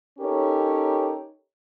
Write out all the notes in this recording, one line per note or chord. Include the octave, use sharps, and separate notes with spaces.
C#4 D#4 G4 A4 A#4 C#5